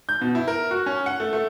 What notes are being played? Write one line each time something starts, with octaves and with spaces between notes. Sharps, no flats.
G6
B2
E4
A#4
F#4
C#4
F#5
A3
A3